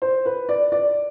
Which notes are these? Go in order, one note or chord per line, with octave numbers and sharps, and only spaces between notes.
C5
B4
D5
D5